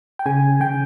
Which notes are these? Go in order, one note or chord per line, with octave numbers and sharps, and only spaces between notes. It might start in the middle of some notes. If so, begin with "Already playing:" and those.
G5
C#3 G#5
C#3 G5